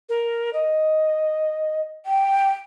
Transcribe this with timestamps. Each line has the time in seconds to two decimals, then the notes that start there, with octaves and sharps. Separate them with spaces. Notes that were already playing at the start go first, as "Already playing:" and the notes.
0.09 A#4
0.53 D#5
2.06 G5